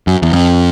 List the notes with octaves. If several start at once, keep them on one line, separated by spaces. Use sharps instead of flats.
F#2
E2
F2